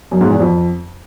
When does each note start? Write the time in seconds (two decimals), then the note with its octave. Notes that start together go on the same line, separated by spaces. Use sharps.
0.11 F#2
0.21 G#2
0.31 E2
0.40 F2